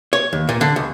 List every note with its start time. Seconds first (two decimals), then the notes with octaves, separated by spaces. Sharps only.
0.13 C#5
0.33 D#2
0.49 A#2
0.61 D3
0.76 C#2